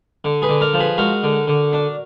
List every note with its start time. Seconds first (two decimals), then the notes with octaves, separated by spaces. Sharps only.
0.24 D3
0.42 G#4 B4
0.49 D3
0.61 A#4 D5
0.74 F3
0.80 G#4 B4
0.98 G#3 F#4 A#4
1.23 D3
1.47 D3
1.73 D4